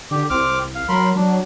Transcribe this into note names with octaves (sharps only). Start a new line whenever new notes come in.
D3 G4
C2 C4 D6 F6
F5
F#3 A#4 B5 C6
F#3 D4